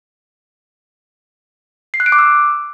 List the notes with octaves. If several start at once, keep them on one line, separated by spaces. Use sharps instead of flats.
C7
F#6
D7
D6
E6